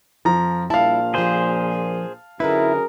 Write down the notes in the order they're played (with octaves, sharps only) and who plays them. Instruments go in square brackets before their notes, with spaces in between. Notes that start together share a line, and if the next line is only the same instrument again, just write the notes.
[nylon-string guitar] F2 [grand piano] F3 A#5
[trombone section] A#1 A#2 [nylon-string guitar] G3 E4 [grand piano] F5 A5
[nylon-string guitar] F3 A#3 G4 [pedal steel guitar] G#4 C5
[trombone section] F#2 G#4 A#4 [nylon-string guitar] D3 D#4 B4 [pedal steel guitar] E4